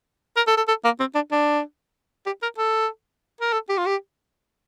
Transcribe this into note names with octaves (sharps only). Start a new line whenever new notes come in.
A#4
A4
A4
A4
A#3
C4
D4
D4
G4
A#4
A4
A#4
A4
G4
F4
G4